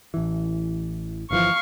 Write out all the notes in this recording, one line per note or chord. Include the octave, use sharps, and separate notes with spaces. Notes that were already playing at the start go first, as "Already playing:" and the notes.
A1 E3
G1 E3 F3 F5 C#6